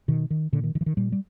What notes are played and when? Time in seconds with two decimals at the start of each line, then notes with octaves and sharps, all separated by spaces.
0.08 B2 D#3
0.30 D#3
0.53 A#2 D3
0.64 D#3
0.75 D#3
0.81 E3
0.86 D#3
0.97 A#2 G3
1.12 G3